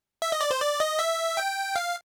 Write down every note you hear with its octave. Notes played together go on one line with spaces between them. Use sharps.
E5
D#5
D5
C5
D5
D#5
E5
G5
F5